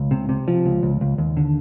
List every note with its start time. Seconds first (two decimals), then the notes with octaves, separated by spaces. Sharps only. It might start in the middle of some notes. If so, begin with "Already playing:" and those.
Already playing: C#2
0.11 C3
0.29 C3
0.48 F3
0.66 C#2
0.83 C#2
1.01 C#2
1.18 D#2
1.37 D3